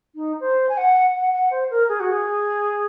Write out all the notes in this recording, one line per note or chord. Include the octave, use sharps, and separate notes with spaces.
D#4
C5
G#5
F#5
F#5
F#5
C5
A#4
G#4
F#4
G#4